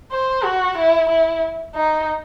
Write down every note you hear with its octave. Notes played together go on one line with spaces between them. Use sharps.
C5
F#4
E4
E4
D#4